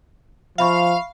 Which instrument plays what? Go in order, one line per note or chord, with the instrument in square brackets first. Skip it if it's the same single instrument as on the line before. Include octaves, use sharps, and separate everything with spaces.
[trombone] F3 [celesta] E5 B5 C#6 [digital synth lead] F5